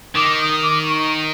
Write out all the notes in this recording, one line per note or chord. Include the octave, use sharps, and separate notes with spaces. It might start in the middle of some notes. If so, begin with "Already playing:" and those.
D#3 D6
D#6
D6
C#6